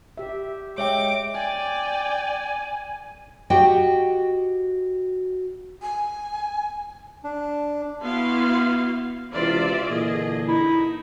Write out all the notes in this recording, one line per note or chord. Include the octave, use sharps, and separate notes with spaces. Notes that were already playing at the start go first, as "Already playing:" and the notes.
G4 E5
G#3 C#5 E5 G5 D6
D5 G5 G#5
F#4 G4 D#5 G5
G#5
D4
B3 E4 F#4 F5 C6
C#2 C3 E3 F4 D5 E5
A#2 D3 E3 G#4 D#5
D#4 E4